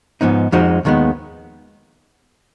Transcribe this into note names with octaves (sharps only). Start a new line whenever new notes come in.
G#2 F3 B3 D#4
F2 F3 G#3 D#4 F#4
D#2 D#3 G#3 B3